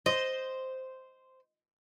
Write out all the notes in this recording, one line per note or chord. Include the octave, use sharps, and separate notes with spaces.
C5 D#5